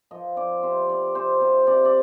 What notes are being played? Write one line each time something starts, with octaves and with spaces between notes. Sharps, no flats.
F3 D#5
C4 D5
C3 C5
C4 D5
C3 C5
C3
C3 D5
D5